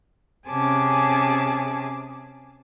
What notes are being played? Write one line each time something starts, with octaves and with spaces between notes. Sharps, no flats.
C3 C#4 G#4 G#5 A5 D6